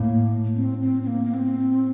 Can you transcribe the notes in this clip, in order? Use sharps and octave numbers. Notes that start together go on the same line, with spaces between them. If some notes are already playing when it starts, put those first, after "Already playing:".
Already playing: A2 A#3
C4
C4
C4
A#3
A#3
C4